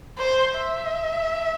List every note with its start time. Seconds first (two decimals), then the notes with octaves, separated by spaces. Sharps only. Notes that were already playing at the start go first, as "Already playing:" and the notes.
0.18 C5
0.56 E5